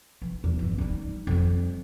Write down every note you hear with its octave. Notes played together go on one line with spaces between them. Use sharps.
E3
E2
G2 E3
G3 D#4
F2 G3